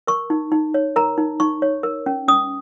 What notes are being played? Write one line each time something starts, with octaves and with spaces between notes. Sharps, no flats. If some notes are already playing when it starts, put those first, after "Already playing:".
A#4 C#6
D#4
D#4
C#5
A#4 A#5
D#4
D#4 C#6
C#5
A#4
C#4
C#4 D#6